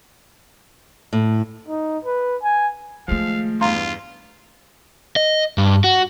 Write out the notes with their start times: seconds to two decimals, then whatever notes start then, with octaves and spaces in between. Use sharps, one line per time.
1.13 A2
1.68 D#4
2.05 B4
2.43 G#5
3.08 D#3 F3 G#3 A3 F5
3.61 E2 G2 F4 F5 A#5 C6
5.16 D#5
5.58 G2
5.84 F#4